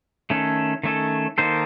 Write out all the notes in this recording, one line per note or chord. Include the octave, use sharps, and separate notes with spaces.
D#3 A3 C#4 A4
D#3 A3 C#4 A4
D#3 A#3 D#4 A4 C5